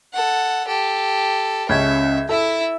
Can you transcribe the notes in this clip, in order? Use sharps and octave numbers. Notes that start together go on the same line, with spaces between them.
A4 F#5
G4 A4
C#2 C#4 E5 G#6
E4 A4 E5